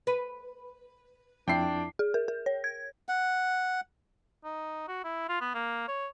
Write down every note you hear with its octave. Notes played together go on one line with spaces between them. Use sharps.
B4
F2 D4 E4 G5 C7
G#4
A#4
A#4
C#5
G#6
F#5
D#4
F#4
E4
F4
B3
A#3
C#5